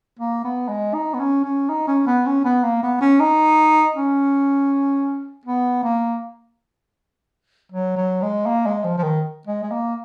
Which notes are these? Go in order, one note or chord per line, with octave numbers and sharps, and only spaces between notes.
A#3
B3
G#3
D#4
B3
C#4
C#4
D#4
C#4
B3
C#4
B3
A#3
B3
C#4
D#4
C#4
B3
A#3
F#3
F#3
G#3
A#3
G#3
F3
F3
D#3
G#3
G#3
A#3